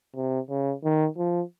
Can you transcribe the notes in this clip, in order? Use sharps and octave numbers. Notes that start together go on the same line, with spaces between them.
C3
C#3
D#3
F3